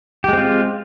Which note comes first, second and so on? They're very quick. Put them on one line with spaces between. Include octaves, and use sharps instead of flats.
G4 G#3 C4 F4